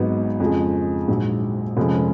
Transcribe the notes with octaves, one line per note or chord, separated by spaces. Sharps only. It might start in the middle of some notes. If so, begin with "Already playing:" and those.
Already playing: G#1 G#2 F#3 B3 D#4
F2 C#3 F3 G#3
A#1 G#2 F#3
F1 F2 F3 G#3 C#4